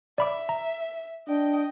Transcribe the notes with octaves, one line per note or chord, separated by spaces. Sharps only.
D5 E5 B5 D6
A#5
D4 D#5 G5